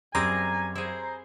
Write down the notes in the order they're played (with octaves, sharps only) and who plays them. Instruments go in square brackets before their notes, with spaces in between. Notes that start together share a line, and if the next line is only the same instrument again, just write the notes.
[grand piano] F#2 [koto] G3 C4 G#4 [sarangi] G#5 [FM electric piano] A#5
[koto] E4 G#4 [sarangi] C5